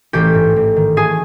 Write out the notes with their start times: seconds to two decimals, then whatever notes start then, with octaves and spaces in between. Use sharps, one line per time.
0.13 A1 G4 G5
0.34 G#2
0.56 A1
0.76 D#3
0.97 A3 G#4 G#5